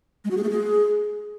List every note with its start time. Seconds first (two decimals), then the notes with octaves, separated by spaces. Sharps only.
0.24 G#3
0.31 F#4
0.37 G#4
0.43 A3
0.50 G#4